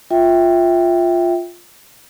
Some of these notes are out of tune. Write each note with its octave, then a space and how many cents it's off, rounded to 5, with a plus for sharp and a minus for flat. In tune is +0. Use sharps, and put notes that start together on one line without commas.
F4 +0 E5 +0 G5 +0